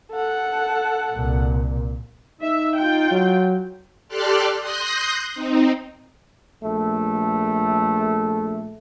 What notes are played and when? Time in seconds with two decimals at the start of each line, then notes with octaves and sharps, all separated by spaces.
0.12 A4 F#5
1.12 C2 A#2
2.41 D#4 E5
2.77 F4 G5
3.11 F#3
4.08 G4 A4 D5 C6 F6 F#6
4.60 C6 D#6 F#6 G6 A#6 C7
5.35 C4 D#4
6.64 A#1 A3